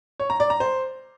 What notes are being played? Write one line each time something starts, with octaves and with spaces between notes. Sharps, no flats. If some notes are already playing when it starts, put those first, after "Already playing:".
C#5
A#5
D5
A#5
C5